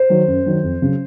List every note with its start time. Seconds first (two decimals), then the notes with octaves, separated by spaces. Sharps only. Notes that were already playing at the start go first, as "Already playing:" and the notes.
Already playing: C5
0.10 D#3 F#3
0.28 F#2
0.46 D#3 F#3
0.63 F2
0.82 C#3 F#3